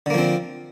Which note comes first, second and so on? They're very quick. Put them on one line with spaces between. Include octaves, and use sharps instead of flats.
D3 A#3 F3 C4